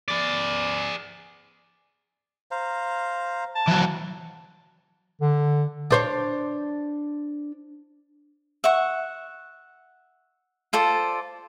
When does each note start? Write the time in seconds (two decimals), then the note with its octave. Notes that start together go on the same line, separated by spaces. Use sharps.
0.08 G#4 D5
2.51 C5 F5 A#5
3.55 A5
3.67 E3 F#3
5.21 D3
5.91 D4 C5 C#5
8.64 E5 F#5 C#6
10.73 F4 A4 C5 D5